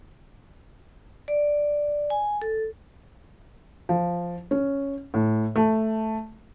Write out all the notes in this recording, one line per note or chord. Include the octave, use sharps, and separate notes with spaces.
D5
G#5
A4
F3
C#4
A2
A3